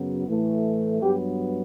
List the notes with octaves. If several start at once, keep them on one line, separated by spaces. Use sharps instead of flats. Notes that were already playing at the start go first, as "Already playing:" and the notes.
Already playing: F#2 C#3 F#3 B3
A2 E3 A3
G2 F#3 B3 G4